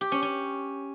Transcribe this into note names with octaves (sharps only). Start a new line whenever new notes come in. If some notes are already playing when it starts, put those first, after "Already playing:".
G4
C#4
C#4